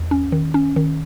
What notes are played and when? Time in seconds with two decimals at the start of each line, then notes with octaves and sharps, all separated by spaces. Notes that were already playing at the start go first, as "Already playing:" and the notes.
Already playing: E2
0.11 C#4
0.32 D#3
0.54 C#4
0.76 D#3